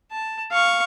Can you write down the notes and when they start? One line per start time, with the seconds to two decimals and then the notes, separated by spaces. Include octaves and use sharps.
0.11 A5
0.52 F5 C#6